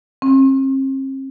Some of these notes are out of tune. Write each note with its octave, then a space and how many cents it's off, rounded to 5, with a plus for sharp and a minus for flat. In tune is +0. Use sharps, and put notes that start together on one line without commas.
C4 +40